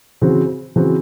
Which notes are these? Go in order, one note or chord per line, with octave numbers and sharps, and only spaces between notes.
C#3 E3 C4 F#4
C#3 E3 C4 F#4